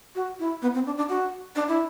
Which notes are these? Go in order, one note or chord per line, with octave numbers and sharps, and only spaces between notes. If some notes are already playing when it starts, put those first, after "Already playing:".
F#4
E4
B3
C4
D4
D4
F#4
D4
E4